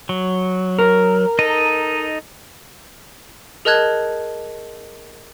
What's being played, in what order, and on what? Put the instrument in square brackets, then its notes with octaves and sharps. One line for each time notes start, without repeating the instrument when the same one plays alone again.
[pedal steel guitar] F#3
[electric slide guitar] A#4
[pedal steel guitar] D#4 A4 D#5
[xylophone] G#4 A#4 D#5 A5 F#6 G#6